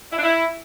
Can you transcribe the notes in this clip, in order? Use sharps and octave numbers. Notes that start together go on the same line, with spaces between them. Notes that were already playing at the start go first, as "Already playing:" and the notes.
E4
D4
E4